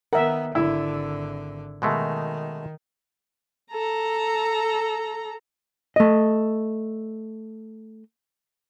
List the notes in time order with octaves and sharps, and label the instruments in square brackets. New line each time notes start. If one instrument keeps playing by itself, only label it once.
[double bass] D#3 B3 [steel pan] A#4 E5 [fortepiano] F#5
[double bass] G#1 D3 [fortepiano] E4
[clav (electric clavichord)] B2 G#3 A3 [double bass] D#3
[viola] A4 A#5
[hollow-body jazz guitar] A3 D#5